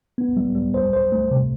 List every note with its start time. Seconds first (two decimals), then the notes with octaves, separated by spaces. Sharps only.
0.18 B3
0.37 G3
0.55 G3
0.74 C5
0.93 C5
1.12 A3
1.31 C3